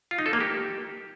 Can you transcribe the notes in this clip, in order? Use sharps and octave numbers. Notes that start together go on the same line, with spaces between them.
F4
D#4
A4
A#3
G4